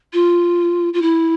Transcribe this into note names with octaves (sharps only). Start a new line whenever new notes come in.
F4
F4
E4